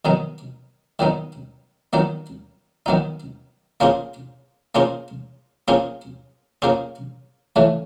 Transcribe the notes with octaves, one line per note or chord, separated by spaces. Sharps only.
D#3 F#3 B3 D#4
D#3 F#3 B3 D#4
D#3 F#3 B3 D#4
D#3 F#3 B3 D#4
A#3 C#4 F4 G#4 C5
A#3 C#4 F4 G#4 C5
A#3 C#4 F4 G#4 C5
A#3 C#4 F4 G#4 C5
C#3 E3 A3 C#4